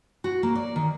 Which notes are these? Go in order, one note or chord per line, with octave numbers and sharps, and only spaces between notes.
F#4
A#3
D5
D#3